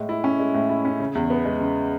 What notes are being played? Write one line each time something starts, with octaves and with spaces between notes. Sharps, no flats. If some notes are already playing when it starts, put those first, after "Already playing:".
Already playing: A2 G#3
E4
C#4
G#3
A2
E4
C#4
C#3
E2
B3
G#3
C#3